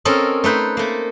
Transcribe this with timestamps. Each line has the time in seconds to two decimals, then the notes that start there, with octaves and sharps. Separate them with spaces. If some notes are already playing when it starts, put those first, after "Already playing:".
0.05 C4 C#4 A4 A#4 D#5
0.44 A3 D#4 B4 C5
0.77 A3 A#3